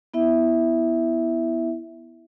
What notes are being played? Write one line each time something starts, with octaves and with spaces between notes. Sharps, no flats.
B3 E4 E5